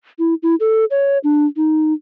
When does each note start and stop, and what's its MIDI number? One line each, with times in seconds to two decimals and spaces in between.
0.19 0.34 64
0.43 0.55 64
0.60 0.85 69
0.91 1.18 73
1.24 1.46 62
1.57 1.93 63